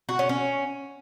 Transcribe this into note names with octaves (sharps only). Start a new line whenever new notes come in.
F#4
C#4
C#4